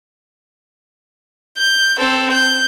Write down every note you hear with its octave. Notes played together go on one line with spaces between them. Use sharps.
G6
C4 A4
G6